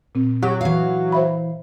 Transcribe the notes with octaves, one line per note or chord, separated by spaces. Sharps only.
A#2 C4
F#3 G4
E3 F5
C5 E5 B5